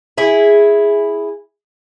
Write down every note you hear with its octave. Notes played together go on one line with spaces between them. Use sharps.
E4 G#4